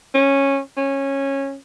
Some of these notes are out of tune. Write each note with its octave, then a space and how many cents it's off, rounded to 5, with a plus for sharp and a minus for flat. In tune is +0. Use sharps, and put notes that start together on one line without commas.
C#4 -10
C#4 -15